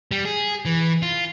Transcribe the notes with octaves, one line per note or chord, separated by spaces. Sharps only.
G3
G#4
E3
F4